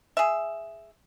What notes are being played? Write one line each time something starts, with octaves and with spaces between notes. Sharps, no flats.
G#4 E5